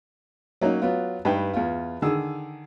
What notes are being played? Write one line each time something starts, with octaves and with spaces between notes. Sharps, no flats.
F#3 A#3 C#4 D#4
F#3 B3 F4
G2 D#4 B4 G5
E2 F4
D3 D#3 G#4 E6